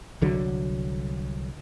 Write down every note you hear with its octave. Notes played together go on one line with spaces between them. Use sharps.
C2 D3 F#3